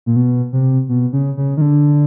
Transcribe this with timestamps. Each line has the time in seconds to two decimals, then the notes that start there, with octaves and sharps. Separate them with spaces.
0.06 A#2
0.16 B2
0.53 C3
0.89 B2
1.13 C#3
1.37 C#3
1.57 D#3
1.61 D3